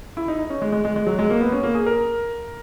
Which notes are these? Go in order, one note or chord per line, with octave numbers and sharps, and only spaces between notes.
E4
D#4
D#4
C#4
G#3
G#3
G#3
G#3
F#3
G#3
A#3
B3
C#4
A#3
G#4
A#4